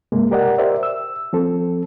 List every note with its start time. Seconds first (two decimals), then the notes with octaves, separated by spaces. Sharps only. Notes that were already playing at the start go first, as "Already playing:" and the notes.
0.12 G2 C3 G#3 A#3
0.31 G4 A#4 D5 D#5 F#5
0.58 G4 A#4 C5 D5 E5
0.83 E6
1.33 F3 C4 A4